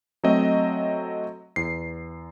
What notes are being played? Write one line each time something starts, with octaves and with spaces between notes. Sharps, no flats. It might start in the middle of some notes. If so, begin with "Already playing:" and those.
F#3 A3 C4 D#5
E2 C7